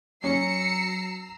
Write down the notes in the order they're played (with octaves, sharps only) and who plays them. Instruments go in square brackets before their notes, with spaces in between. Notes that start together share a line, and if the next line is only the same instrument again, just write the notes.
[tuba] F#3 [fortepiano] C#4 [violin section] A#5 E6 C7 [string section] C#7